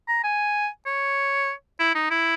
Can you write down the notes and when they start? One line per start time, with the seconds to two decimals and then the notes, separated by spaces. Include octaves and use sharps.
0.08 A#5
0.24 G#5
0.86 C#5
1.79 E4
1.95 D#4
2.10 E4